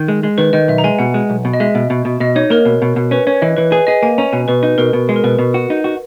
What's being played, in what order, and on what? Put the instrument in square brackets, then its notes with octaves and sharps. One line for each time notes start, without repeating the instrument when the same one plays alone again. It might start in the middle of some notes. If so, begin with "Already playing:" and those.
Already playing: [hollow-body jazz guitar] D#3
G#3
G#3
[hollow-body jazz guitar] D#3 [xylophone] B4
[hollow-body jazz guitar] D#3 [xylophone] D#5
[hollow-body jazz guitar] B1 [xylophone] E5
[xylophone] A#5
[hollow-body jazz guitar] G#3 [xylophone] G#5
[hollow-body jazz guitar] B2 [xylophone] F#5
[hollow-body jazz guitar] G#3
B1
B2
[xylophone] D#5
[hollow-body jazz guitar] G#3 [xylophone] E5
[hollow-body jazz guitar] B2
B2
B2
[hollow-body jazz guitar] B2 [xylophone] D#5
[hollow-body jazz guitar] D#4 [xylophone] C#5
[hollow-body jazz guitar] A#3 [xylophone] A#4
[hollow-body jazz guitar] B2
B2
B2
[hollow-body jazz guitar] C#4 [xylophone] B4
[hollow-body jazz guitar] C#4 [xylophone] C#5
[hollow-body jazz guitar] E3 [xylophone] D#5
[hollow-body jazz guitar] E3 [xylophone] B4
[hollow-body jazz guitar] G#4 [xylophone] B4
[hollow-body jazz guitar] G#4 [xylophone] D#5
[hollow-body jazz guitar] A#3 [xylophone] G#5
[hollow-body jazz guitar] C#4 [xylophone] A#5
[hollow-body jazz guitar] B2 [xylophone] G#5
[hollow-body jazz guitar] B2 [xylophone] B4
[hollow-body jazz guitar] D#4 [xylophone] B4
[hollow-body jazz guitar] B2 [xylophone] A#4
[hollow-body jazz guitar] B2
G#3
[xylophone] A#4
[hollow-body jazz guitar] B2 [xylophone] B4
[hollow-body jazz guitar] B2
F#4
D#4
F#4